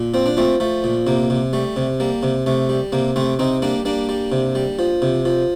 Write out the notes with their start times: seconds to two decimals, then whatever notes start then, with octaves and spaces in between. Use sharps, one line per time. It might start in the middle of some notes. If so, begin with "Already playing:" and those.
Already playing: A#2
0.14 F3 C4
0.26 D4
0.37 F3 A3 C4
0.60 F3 A3
0.84 A#2
1.07 C3 A#3
1.30 C3
1.53 G3 A3
1.76 C3
2.00 G3 A#3
2.23 C3
2.46 C3 A3
2.69 G3
2.92 C3 A#3
3.16 C3 A3 C4
3.39 C3 C4 D#4
3.62 G3 A#3 D4
3.85 G3 A#3 D4
4.09 G3
4.32 C3
4.55 G3
4.79 F3
5.02 C3
5.25 F3